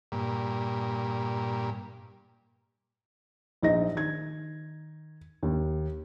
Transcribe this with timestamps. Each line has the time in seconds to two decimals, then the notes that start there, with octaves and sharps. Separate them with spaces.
0.12 G2 A#2
3.62 A#1 D#4 D#5 A#6
3.95 D#3 G#6
5.43 D#2